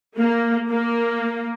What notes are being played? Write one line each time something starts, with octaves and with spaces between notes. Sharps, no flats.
A#3
A#3